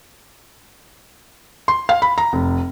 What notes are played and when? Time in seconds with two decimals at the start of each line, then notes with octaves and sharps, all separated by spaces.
1.68 C6
1.89 F5
2.02 B5
2.18 A#5
2.33 F1